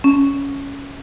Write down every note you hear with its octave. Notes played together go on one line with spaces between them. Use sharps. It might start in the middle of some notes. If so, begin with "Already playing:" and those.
C#4